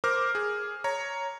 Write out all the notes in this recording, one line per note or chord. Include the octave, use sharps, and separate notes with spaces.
A#4 C5 D6 F6
G#4
C#5 A#5